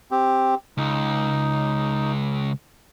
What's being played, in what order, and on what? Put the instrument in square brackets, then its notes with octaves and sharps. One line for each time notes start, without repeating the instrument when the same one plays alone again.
[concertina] C4 G4
[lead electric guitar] C#2 [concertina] D#4